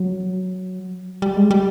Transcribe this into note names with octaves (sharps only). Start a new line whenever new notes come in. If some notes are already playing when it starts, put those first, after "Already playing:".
Already playing: F#3
G3
G#3
G3